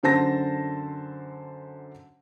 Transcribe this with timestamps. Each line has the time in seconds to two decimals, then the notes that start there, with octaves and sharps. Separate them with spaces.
0.03 F#2 D3 C5 A5 A#6